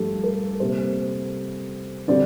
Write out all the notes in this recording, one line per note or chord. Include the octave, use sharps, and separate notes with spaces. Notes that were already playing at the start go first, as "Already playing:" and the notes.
Already playing: G2 F3 A3 G4 A4
A#4
C3 G3 A#3 C5
D3 G3 C4 D5